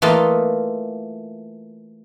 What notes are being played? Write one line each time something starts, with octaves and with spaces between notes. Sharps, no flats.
E3 A3 A#3 F4 D#5